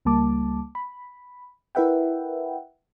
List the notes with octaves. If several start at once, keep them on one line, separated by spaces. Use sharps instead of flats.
C#2 G3 A#3 A5 D6
B5
E4 A#4 B4 E5 F#5 G5